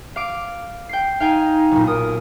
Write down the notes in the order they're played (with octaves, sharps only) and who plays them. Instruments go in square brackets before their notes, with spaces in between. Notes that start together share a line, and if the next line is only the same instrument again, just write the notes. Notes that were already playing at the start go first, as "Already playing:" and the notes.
[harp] F5 D6 D7
G5 C7
[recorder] D#4 [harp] F5 G5 G#5
[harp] B1 A#2
[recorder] A#4 [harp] D#6